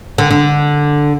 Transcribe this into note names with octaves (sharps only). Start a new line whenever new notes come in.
D3
D3